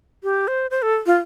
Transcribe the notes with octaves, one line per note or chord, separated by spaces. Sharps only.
G4
C5
C5
A4
F4